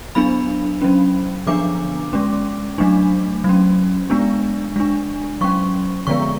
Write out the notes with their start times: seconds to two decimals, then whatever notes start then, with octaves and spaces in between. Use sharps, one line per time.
0.15 F#3 B3 D4 B5
0.82 F#3 C#4
1.47 D3 F3 B3 D4 D6
2.13 G#3 C#4
2.78 F#3 A3 D4
3.44 F#3 C#4
4.10 G#3 B3 D4
4.76 G#3 D4
5.41 F#3 C#4 C#6
6.07 D3 F3 G#3 B3 C#6